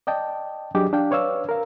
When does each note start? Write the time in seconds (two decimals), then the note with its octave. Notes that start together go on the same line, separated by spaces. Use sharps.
0.07 D5 D#5 G5 A5
0.75 F#3 D4 G4 G#4 D5 D#5
0.93 D4 F5 G5
1.11 B4 C#5 D5 F5 E6
1.49 A#4 F5